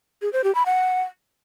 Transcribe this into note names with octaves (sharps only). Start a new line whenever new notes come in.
G#4
C5
G4
B5
F#5